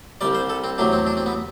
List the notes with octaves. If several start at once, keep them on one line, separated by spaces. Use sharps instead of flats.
C2 C3 G3 D5
C5
A4
C4
E2 C3 F#3 A3 D4
C4
D4
C4
B3